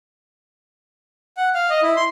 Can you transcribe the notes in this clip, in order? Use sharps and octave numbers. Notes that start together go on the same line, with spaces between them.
F#5
F5
D#5
E4
C6